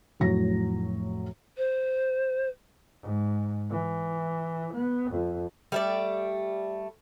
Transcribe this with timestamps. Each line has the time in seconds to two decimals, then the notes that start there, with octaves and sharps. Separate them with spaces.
0.20 F1 A2 F#3 A#6
1.57 C5
3.02 G#2
3.70 E3
4.74 B3
5.11 F2
5.72 G3 A3 D5